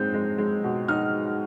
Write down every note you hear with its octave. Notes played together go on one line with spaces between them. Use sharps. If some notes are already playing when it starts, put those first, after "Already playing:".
Already playing: G#3 C4 D#4 G6
G#3
G#3
B2
D#4 F6